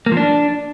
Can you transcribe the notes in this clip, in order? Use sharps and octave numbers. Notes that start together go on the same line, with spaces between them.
A#3
F3
D4